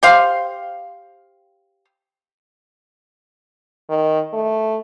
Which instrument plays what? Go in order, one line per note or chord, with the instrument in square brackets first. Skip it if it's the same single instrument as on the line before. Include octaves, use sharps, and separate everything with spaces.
[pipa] G4 C5 F5
[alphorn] D#3
A3